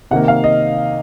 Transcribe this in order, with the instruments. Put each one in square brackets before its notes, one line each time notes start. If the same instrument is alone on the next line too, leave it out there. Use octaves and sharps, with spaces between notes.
[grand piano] C3 D#3 A#3 F#5
F5
D#5